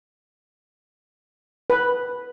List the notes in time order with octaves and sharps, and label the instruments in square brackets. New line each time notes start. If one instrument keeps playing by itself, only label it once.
[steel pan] B4